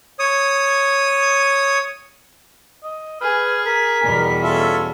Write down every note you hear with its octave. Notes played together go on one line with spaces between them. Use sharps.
C#5 D#6
D#5
G#4 B4 F6
A#4 B6
E2 B2 G3
C#4 F4 A4 E5